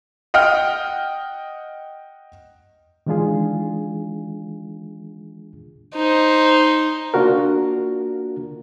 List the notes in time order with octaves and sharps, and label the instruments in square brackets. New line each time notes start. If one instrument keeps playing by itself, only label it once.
[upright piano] D#5 F#5 G5 F6
[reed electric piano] D#3 E3 G#3 D4 F4 G#4
[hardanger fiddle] D#4 C5
[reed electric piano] A#3 D4 F4 F#4 A#4